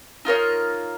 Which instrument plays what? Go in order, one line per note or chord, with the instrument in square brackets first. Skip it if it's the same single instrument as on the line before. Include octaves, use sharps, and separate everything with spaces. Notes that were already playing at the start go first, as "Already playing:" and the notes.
[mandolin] D#4 F4 A#4 C#5